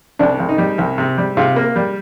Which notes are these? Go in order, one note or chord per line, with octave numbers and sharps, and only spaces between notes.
C2 D4
C2
D#4
G3
C2
C3
G3
C3 F4
A#3
G3